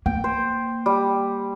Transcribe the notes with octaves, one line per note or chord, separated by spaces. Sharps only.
A#3 G5
C5
G3